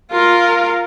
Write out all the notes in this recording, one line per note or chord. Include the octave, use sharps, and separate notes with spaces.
F4 A#4